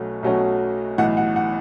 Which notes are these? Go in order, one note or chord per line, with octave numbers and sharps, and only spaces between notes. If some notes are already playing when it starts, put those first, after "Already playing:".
Already playing: B1 B2 F#3 A3 C#4
B1 B2 F#3 A3 C#4
B1 A2 E3 F#5
F#5
F#5